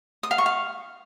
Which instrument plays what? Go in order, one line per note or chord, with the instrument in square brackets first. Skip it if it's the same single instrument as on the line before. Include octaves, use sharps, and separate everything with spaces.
[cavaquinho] D#6
F5
C#6
F5